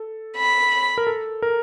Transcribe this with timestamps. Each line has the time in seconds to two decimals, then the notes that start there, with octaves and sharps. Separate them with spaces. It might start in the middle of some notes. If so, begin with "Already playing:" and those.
Already playing: A4
0.37 B5
0.98 A#4
1.07 A4
1.42 A#4